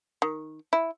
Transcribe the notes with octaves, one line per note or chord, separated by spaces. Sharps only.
D#3
E4